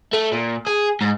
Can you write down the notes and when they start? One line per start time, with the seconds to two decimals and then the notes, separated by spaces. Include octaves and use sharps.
0.13 A3
0.32 A#2
0.67 G#4
1.01 G#2